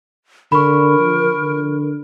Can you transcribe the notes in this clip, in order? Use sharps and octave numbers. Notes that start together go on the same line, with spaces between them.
D3 A#4 B5 C#6
F3
D3